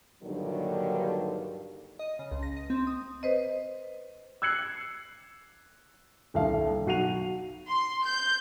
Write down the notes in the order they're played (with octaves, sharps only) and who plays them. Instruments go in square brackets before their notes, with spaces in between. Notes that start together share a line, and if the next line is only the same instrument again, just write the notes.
[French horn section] G2 A#2 D3 D#3 F#3 G3
[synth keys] D#5
C#3
C#2
A#6
D#5
C4
D#6
[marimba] B4 C5 D#5
[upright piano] E6 F#6 G#6 C7 C#7 F#7
D#1 C2 D4 F5
B1 F#4 F#5 C7 D#7 F7
[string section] C6
G6